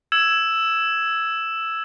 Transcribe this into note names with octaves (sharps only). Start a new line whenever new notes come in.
E6 G#6 E7